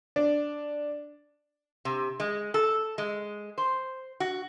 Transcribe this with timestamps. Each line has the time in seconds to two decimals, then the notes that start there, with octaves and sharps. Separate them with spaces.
0.16 D4
1.85 C3
2.20 G#3
2.54 A4
2.98 G#3
3.58 C5
4.20 F#4